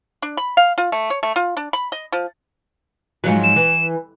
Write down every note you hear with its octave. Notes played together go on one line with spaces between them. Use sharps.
D4
B5
F5
F4
A3
C#5
A3
F4
D4
B5
D#5
F3
G#2 F3 F#3
E7
E3